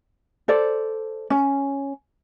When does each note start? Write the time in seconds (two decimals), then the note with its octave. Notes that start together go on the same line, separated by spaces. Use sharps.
0.48 A4 C5 D5
1.30 C#4